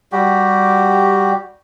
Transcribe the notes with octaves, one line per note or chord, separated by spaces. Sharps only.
G3 F#4 G4